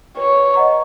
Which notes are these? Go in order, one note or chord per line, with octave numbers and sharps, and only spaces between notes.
B4 C#5
D#5 F#5 A#5 C#6